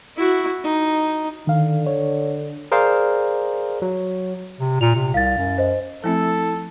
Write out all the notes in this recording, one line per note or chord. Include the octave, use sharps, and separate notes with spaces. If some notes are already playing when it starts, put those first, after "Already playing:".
E4 F#4
D#4
D3 D#3 F5
C#5
G#4 A#4 C5 D5 F5
F#3
C3
A#2 F7
C3
C2 F5 A6
F#2
C5 D#5
F3 A3 C4 E4 A4